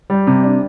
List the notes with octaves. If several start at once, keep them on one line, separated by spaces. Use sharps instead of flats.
G3
C3
D4